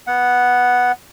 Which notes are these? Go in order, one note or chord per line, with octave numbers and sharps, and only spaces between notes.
B3 F#5